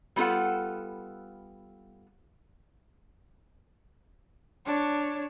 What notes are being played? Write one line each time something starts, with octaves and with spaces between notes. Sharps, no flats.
G3 B3 F4 A4 F#5
D4 C#5